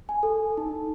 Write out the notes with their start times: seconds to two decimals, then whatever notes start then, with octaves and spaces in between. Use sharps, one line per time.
0.09 G#5
0.23 A4
0.57 D#4